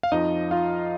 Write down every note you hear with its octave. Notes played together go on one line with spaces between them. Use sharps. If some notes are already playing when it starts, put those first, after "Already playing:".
F5
F2 F3 D#4 D#5
F4 F5